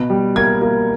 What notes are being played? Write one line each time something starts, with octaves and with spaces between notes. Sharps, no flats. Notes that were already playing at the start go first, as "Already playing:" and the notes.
Already playing: B2
G3
A#3 G#6
A#3